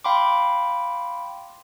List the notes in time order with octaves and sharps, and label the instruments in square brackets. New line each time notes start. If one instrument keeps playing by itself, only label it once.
[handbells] F5 G5 B5 C6 D6